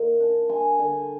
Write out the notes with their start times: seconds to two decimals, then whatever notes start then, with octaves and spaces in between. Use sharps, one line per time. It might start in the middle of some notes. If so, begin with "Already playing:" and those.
Already playing: D#3 A#3
0.20 D4
0.49 G3 G#5 C6
0.79 D3